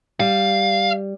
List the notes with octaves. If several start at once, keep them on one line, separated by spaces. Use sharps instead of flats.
G3 F5